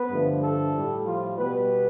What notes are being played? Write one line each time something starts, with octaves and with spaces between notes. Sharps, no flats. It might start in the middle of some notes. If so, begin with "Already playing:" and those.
Already playing: B3 B4
G2 D3 F3 A3
A3 A4
A2 G3
F3 F4
B2 G3 B3 B4